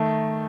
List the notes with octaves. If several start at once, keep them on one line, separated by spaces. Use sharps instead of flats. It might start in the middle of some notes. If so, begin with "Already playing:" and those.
Already playing: D#3 A3